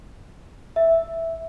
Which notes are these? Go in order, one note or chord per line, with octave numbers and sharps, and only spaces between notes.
E5